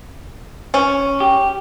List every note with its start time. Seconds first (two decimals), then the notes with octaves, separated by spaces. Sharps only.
0.74 C#4
1.20 G4